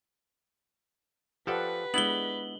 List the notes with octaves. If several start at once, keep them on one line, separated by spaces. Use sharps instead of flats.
F3 G4 A4 B4 D5 F#5
G#3 B3 D4 E4 F#7 G7